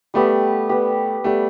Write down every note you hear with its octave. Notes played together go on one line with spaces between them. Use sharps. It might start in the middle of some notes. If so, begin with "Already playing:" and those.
G3 A3 B3 G4
G3 B3 G4
G3 A3 B3 G4